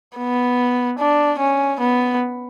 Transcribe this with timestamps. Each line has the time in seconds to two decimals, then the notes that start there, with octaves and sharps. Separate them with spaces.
0.17 B3
0.99 D4
1.39 C#4
1.80 B3